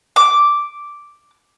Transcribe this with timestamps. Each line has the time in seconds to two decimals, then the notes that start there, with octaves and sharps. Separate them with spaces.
0.16 D6